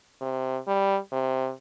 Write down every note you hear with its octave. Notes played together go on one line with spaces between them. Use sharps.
C3
G3
C3